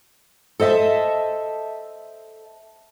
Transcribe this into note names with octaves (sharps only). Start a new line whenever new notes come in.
A4 C5 D#5 E5 A5